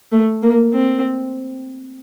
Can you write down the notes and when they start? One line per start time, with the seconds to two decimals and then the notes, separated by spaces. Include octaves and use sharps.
0.12 A3
0.43 A#3
0.73 C4